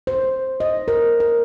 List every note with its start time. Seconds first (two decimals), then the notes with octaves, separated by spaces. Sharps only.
0.07 C5
0.60 D#5
0.88 A#4
1.20 A#4